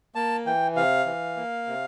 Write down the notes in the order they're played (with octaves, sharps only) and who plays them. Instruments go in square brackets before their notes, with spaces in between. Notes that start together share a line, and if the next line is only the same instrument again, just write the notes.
[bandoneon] A#3 A5
E3 G5
C3 F5
E3
A#3
C3